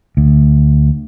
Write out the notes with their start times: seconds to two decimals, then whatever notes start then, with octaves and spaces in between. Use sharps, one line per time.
0.17 D2